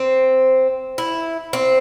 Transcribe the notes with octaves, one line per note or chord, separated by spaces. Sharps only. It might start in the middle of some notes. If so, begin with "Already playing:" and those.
Already playing: C4
E4
C4